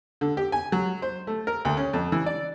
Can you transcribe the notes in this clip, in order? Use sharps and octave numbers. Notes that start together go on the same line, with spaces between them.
D3
G4
G#5
F#3
C5
A3
A#4
D2
C#4
F2
E3
D5